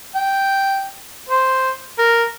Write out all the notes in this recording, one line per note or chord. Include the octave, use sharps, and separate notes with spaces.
G5
C5
A#4